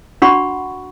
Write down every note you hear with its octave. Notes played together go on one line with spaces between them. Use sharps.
D4 F#4 F#5 B5 C#6